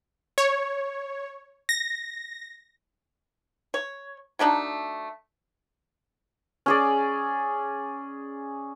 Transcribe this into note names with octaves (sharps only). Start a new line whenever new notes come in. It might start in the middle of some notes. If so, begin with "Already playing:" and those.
C#5
A#6
C#5
F#3 A3 D4 D#4
C#4 G#4 D5